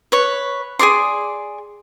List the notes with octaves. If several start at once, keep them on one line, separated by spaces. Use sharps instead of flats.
B4 C#5
G#4 A#4 D5 C6